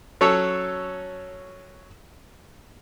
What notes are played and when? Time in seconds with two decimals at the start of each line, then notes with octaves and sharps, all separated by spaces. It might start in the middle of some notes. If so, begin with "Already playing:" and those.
0.21 F#3 C#4 A4 C#5